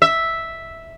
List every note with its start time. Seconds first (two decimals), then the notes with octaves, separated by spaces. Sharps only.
0.02 E5